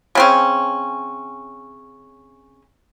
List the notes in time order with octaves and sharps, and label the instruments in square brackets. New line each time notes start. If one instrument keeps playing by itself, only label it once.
[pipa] C#3 C4 C#4